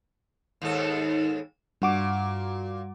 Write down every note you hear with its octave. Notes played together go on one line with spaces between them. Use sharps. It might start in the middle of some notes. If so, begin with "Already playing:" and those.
D#2 G#2 A4
G2 A#2 F#4 D6